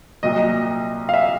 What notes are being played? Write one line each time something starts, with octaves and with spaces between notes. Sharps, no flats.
C2 A#2 F#3 D#5
F5
E5